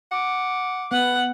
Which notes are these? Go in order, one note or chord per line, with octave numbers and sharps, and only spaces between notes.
F#5 D6
B3 F#5